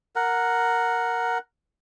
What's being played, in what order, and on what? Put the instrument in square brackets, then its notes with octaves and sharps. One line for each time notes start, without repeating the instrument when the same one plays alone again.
[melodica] A#4 F#5